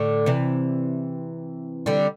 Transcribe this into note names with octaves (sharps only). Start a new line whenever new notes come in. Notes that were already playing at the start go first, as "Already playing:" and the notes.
Already playing: A2 D3
C3 E3
D3 G3